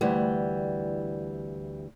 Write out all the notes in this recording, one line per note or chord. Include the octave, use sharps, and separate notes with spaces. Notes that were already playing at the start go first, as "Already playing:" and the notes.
D2 E3 G3